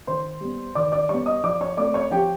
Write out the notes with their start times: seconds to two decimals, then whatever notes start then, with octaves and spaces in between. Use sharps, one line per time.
0.07 D#3 C5 C6
0.41 G3 B3
0.75 D#3 D5 D6
0.92 D5 D6
1.09 G3 B3 C#5 C#6
1.26 D#5 D#6
1.44 F3 D5 D6
1.61 C#5 C#6
1.77 A3 C4 D5 D6
1.94 C#5 C#6
2.11 F3 G4 G5